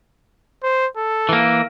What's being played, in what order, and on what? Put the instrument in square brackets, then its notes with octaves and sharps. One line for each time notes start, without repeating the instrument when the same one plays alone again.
[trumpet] C5
A4
[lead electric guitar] E3 A#3